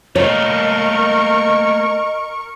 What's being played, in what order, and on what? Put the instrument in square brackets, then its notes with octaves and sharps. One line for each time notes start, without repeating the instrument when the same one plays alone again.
[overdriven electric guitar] A3 A#3 [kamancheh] A#4 C#6 [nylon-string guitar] C#5 [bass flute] D#5